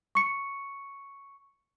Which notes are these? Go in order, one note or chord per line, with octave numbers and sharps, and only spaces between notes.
C#6 C#7